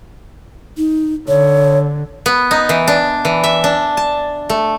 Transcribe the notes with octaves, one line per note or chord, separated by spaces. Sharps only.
D#4
D3 C#5
B3
D#4
E3
D4
E3
E5
D4
A5
A3